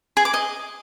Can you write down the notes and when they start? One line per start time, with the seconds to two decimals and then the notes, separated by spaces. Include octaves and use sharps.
0.17 G#4
0.25 D6
0.34 D#5